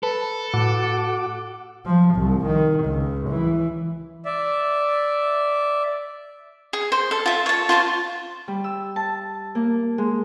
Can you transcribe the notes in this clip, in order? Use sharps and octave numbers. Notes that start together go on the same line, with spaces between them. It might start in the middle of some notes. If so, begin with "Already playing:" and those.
A4 B4 B5
A2 F#4 F#5 D6
F3
C2
D#3
C#2
E3
D5 E5
G#4
C5
A4
F4 E5
C#5 A5
F4 C5 A5
G3
E6
A5
A#3
G#3